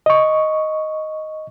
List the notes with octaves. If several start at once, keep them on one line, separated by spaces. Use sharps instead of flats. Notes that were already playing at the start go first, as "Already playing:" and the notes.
D#5 C#6